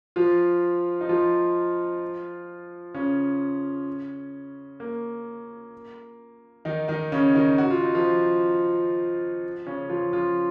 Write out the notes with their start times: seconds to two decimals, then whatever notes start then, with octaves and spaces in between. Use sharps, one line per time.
0.16 F3 F4
1.01 D#4
1.09 F3 F4
2.94 C#3 C#4
4.80 A#3
6.65 D#3 D#4
6.88 D#3 D#4
7.12 C#3 C#4
7.35 D#3 D#4
7.58 F#4
7.70 F4
7.83 D#4
7.95 F3 F4
9.67 C#3 C#4
9.90 F3 F4
10.13 F3 F4